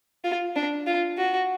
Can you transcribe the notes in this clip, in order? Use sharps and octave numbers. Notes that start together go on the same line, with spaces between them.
F4
D4
F4
F#4